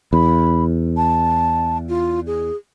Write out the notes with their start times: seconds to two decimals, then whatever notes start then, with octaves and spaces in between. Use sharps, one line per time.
0.13 E2 B5
0.97 A5
1.89 F4
2.27 G#4